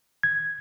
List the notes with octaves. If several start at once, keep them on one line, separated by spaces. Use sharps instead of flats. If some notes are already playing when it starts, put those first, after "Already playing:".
G#6